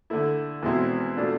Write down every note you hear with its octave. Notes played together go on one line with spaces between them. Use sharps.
D3 A3 E4
E2 B2 G#3 C4 E4
B2 A3 D4 F4